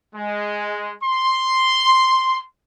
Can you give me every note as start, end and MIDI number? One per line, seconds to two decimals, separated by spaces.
0.15 0.92 56
1.04 2.41 84